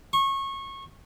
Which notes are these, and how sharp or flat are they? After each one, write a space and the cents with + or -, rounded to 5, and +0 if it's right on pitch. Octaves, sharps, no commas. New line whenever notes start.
C#6 -25